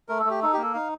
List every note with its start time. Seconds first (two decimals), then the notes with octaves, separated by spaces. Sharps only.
0.09 A3 A#4
0.19 A4
0.25 A3 G4
0.42 D#4 A4
0.53 A#3 G4
0.63 A4
0.74 D#4 F5